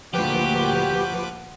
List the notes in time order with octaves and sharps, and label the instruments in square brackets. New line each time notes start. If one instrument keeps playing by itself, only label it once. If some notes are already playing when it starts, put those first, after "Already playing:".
[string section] D2 A#2 [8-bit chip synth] F3 B4 D6 [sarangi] F#4 [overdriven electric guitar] G4